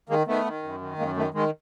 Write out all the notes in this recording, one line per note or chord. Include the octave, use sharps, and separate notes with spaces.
D#3 G#3 A#3
D#3 A3 B3
D#3
F#2
D#3
F#2 G#3 A#3
D#3 A3
D#3 G#3